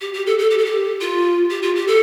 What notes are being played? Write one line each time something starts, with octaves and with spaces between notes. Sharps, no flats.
G4
G4
A4
A4
G4
A4
G4
F4
G4
F4
G4
A4